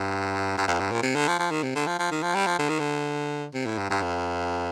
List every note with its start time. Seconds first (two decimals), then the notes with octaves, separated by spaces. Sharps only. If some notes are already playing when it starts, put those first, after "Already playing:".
Already playing: G2
0.58 G2
0.68 F2
0.80 G2
0.92 A#2
1.03 C3
1.15 D3
1.28 F3
1.39 F3
1.51 D#3
1.63 C3
1.75 D3
1.87 F3
1.99 F3
2.11 D#3
2.23 F3
2.35 G3
2.46 F3
2.59 D3
2.69 D#3
2.79 D3
3.54 C3
3.66 A2
3.78 G2
3.90 G2
4.02 F2